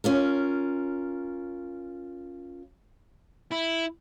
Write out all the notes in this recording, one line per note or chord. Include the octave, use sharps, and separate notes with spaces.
C#4 F4 A#4
E4